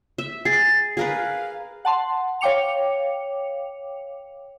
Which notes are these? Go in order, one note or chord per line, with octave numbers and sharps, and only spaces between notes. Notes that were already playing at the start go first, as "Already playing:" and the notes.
E5
G#4 A6 C7
G#4 A#4 B4 F5
F#5 A5 C6
C#5 F5 G5 D6 C#7 F7